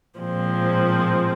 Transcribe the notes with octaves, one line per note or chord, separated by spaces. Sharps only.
A#2 F3 G#3 C4